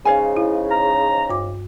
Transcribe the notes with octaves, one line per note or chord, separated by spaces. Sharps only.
G#2 C#3 C#5 F5 G#5
E4
A#5
G2 D6